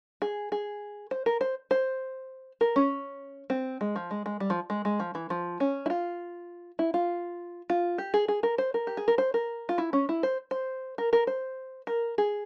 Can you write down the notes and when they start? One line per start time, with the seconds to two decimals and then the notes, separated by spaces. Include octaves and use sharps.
0.22 G#4
0.52 G#4
1.11 C5
1.26 A#4
1.41 C5
1.71 C5
2.61 A#4
2.76 C#4
3.50 C4
3.81 G#3
3.96 F3
4.11 G#3
4.26 G#3
4.40 G3
4.50 F3
4.70 G#3
4.85 G#3
5.00 F3
5.15 E3
5.30 F3
5.60 C#4
5.86 E4
5.90 F4
6.79 E4
6.94 F4
7.70 F4
7.98 G4
8.14 G#4
8.28 G#4
8.43 A#4
8.58 C5
8.74 A#4
8.87 G4
8.97 G#4
9.08 A#4
9.18 C5
9.34 A#4
9.69 F4
9.78 E4
9.93 C#4
10.09 E4
10.23 C5
10.51 C5
10.98 A#4
11.13 A#4
11.27 C5
11.87 A#4
12.18 G#4